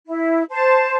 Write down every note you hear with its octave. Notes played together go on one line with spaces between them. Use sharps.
E4
C5 A5